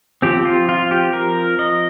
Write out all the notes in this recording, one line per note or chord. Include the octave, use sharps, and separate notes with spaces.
F3 C4 G4
F4
F4
G4
A#4
D#5